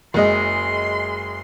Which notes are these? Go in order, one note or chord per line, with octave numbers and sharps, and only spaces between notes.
F#1 G#3 D#5 C6